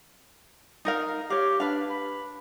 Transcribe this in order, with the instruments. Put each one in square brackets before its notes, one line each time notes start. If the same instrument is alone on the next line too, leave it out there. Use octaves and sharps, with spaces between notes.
[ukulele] D#4 A#4 F5
[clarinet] G4 [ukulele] C#5 F5
[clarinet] D4 [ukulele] B4 F5
[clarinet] B5